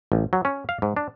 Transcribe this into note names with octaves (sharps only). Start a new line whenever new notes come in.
A1
F#3
C#4
F5
G#2
D4